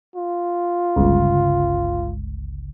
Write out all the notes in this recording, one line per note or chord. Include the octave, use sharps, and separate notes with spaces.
F4
G1 C#2